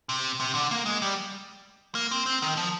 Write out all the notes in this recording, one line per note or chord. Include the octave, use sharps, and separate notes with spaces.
C3
C3
D3
A#3
G#3
G3
A#3
C4
C4
D#3
F3